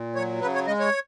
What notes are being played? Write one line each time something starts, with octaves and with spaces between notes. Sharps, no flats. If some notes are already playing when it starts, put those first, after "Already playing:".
Already playing: A#2
F#3 C#5
C#3 B4
C#5
G#3 D#5
C#5